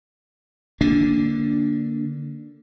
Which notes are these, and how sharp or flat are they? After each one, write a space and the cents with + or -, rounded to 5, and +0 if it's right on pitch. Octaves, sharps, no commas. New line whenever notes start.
D3 +0 A#3 +0 D4 -10